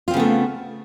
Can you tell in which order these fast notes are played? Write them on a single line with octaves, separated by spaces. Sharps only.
F4 C4 C#3 B3 A3